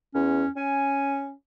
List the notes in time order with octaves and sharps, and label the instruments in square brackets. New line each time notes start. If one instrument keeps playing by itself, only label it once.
[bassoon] E2 [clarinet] C#4
[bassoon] C#4 [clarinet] G#5